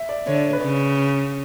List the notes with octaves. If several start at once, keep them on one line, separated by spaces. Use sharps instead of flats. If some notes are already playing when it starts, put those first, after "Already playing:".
Already playing: E5
D5
D3 C#5
D5
C#5
B4
C#3